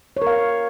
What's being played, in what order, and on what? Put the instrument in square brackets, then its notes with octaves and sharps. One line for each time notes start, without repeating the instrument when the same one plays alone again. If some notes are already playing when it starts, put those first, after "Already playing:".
[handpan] C#5
A#4
F5